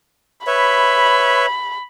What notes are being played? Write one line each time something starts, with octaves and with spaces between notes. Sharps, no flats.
B4 C#5 E5 B5